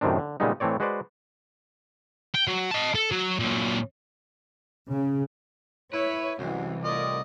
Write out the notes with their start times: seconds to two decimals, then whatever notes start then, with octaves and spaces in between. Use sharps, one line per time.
0.01 F#2 A2 C3 D#3 C4 D4
0.19 D3
0.40 A#2 C#3 G3 G#3 B3 D#4
0.60 A2 E3 A3 C4 C#5 D5
0.80 G#3 F#4 B4 C5 D5
2.35 G5
2.48 F#3
2.71 D#5 A5
2.95 A4
3.12 F#3
3.39 A#2 F#3
4.91 C#3
5.93 E4 B4 C#5
6.39 C2 F#2 C3 E3 G#3
6.84 A2 F4 A#4 D5 D#5